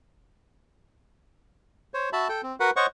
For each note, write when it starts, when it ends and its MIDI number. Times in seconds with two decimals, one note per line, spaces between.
1.94 2.09 72
1.94 2.09 73
2.13 2.28 66
2.13 2.28 76
2.13 2.28 81
2.13 2.28 83
2.29 2.41 69
2.29 2.41 79
2.43 2.56 60
2.60 2.70 66
2.60 2.70 70
2.60 2.70 71
2.60 2.70 78
2.60 2.70 83
2.76 2.86 72
2.76 2.86 73
2.76 2.86 75
2.76 2.86 78
2.76 2.86 85